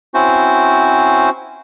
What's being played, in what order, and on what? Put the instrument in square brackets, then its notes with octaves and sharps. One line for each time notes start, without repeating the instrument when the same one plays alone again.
[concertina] C4 C#4 E4 F#4 C5